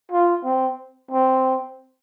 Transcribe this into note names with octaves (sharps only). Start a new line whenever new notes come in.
F4
C4
C4